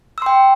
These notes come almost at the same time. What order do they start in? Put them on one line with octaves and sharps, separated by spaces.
E6 C6 G5